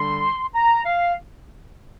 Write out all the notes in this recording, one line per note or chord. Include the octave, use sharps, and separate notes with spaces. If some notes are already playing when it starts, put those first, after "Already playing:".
Already playing: D3 G3 D4 C6
A#5
F5